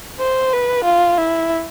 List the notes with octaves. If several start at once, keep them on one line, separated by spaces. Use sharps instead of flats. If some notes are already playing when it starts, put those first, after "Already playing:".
C5
B4
F4
E4